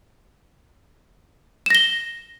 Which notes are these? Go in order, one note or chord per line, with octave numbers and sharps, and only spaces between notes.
A#6 E7 G7